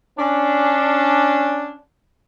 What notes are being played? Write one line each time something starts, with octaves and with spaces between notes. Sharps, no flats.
C#4 D4